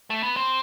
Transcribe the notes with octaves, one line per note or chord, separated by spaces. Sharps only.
A3
B3
C4